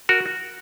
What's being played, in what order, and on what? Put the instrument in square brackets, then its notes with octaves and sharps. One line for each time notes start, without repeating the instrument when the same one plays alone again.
[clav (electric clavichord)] F#4 A#4